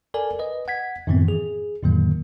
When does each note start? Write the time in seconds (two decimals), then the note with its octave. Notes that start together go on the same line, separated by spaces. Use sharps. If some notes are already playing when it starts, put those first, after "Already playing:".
0.14 A4 A#4 D5 G#5
0.39 B4 D#5
0.68 F#5 G#6 B6
1.07 F#2 A2 D#3 E3 B3 C4
1.28 G#4
1.83 F2 A2 D3 D#3 F#3 A#3